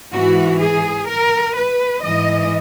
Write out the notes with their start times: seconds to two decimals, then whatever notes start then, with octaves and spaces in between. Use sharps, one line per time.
0.13 G#2 E3 F#4
0.61 G#4
1.08 A#4
1.56 B4
2.04 G#2 E3 D#5